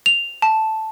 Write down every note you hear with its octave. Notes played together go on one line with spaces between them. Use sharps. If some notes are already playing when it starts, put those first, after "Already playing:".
F7
A5